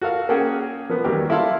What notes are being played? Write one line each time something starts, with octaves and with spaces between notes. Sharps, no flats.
F#4 A4 A#4 F5
A#3 C#4 G#4 A4 F#5 G5
F3 A#3 B3
D#2 F#3 G3 G4 A#4
E4 A4 E5 F5 A5 C6